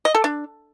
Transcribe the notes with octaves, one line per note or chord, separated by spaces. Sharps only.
D#5
A4
D4